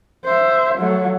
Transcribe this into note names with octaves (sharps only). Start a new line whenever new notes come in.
C5 E5
F#3 A3